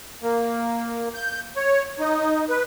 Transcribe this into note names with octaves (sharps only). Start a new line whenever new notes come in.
A#3
G6
C#5
D#4
B4